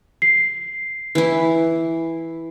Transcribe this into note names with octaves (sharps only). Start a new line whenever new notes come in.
C7
E3 E4